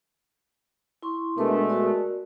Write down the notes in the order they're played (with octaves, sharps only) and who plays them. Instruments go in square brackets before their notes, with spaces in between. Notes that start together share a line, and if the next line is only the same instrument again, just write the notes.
[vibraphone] E4 C6 C#6
[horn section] B2 G#3 A3 [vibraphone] D4 A#4 B4
[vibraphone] F#4 A#4 D5